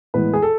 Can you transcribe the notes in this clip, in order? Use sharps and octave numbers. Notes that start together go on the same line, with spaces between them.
A2 E3 G#3 B3 B4
G#4
A4